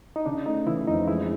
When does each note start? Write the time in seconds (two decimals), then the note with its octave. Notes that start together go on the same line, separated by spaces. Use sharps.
0.16 D#4
0.26 C#3 D4
0.46 A3 D#4
0.67 C#3 E3 E4
0.87 F2 D#4
1.07 E3 G#3 E4